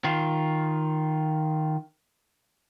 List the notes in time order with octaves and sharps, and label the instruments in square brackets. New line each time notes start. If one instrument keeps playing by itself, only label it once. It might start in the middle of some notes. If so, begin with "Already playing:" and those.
[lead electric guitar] D#3 F4